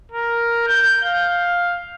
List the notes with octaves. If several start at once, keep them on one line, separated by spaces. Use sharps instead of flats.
A#4
G6
F5